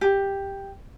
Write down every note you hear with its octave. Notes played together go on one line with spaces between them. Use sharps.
G4